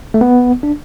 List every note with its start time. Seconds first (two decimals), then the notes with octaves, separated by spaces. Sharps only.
0.14 A3
0.21 B3
0.63 D4